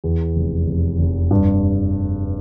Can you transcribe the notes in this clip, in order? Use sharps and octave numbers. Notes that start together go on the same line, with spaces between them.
E2
F1
F1
F1
G2